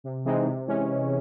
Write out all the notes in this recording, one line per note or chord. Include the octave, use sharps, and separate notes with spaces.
C3
E3 G#3 C4 D#4
C3
E3 G#3 C#4